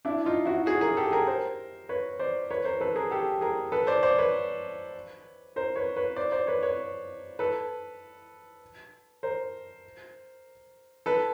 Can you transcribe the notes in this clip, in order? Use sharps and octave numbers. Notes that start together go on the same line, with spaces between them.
D4 E4
D#4 F4
E4 F#4
F#4 G#4
G#4 A#4
G4 A4
G#4 A#4
A#4 C5
B4 C#5
C5 D5
B4 C#5
A#4 C5
A4 B4
G#4 A#4
G4 A4
G#4 A#4
A4 B4
C5 D5
C5 D5
B4 C#5
A#4 C5
B4 C#5
B4 C#5
C5 D5
C5 D5
B4 C#5
B4 C#5
A4 B4
A#4 C5
A4 B4